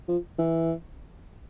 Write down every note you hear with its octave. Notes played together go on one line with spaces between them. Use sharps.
F3
E3